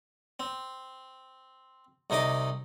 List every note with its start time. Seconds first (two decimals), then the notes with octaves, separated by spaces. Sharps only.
0.40 C4
2.10 C2 C3 D#4 D#5 D6